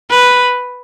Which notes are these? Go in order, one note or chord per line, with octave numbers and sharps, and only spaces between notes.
B4